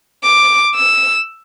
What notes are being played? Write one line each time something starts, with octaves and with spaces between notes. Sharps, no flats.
D6
E6